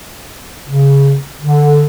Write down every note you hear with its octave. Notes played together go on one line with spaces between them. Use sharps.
C#3
D3